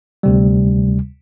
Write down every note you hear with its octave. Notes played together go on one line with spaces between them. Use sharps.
D2 C3 G3